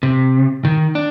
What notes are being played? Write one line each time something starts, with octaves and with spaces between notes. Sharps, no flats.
C3
D#3
D4